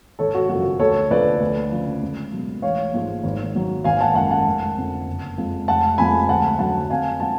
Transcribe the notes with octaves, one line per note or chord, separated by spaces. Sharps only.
G#1 A4 C#5
F#4
F#2 C#3 F3 F#4
D2 A4 C#5
D3 F3 B4 D5
D2
C#3 F3
C#2
B2 F#3
A1 C#5 F5
G#2 F3 G#3
G#1
G#2 F#3
G#1 F5 G#5
F#5 A5
F#2 F3 G#3 F#5 A5
F#5 A5
F1
F2 D3 F3
F#1
F2 F3 G#3
F1 F#5 A5
F2 F3 G#3 G#5 B5
D2 F#5 A5
D3 F#3 F#5 A5
F2 F5 G#5
F3 G#3 F#5 A5